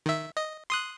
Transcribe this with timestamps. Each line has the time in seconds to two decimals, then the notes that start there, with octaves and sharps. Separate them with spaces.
0.06 D#3 E5
0.37 D#5
0.70 C6 D#6 F#6